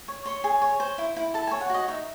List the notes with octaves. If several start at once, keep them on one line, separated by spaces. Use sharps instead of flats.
C#5
C#5 C6
G#4
C#5
C5
E4
E4
A4 A5
C#5 G#5
F#5
F#4 D#5
D#4 E5